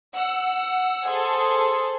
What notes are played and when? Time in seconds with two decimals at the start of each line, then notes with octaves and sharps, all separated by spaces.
0.15 F#5 E6
1.06 G#4 A4 C5